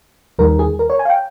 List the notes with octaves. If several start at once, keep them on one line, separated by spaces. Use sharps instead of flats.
D#2 D#3 G3 A#4
G#4
A#4
C#5
G#5
F5
G5